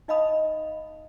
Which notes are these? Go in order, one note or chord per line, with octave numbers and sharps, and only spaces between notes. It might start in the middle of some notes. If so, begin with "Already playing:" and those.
D#4 D#5 F5 B5 D#6